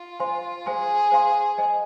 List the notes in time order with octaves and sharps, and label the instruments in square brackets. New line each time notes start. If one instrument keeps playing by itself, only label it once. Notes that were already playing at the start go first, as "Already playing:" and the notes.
Already playing: [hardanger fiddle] F4
[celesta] C5 F5 G#5 C6
[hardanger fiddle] G#4 [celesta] C5 F5 G#5 C6
[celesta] C5 F5 G#5 C6
C5 D#5 G#5